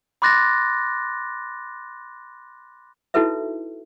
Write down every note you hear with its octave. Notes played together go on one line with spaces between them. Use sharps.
B5 C6 D6 F#6 A6 A#6
D#4 E4 F#4 A4 B4 E5